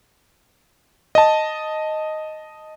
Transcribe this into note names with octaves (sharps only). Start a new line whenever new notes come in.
D#5 A5